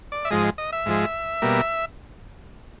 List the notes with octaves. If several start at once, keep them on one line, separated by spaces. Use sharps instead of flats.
D5
E5
G#2 F3 G#3 D#5
D#5
E5
G#2 F3 G#3
B2 G3 A#3